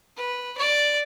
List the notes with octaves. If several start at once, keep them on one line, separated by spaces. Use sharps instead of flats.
B4
D5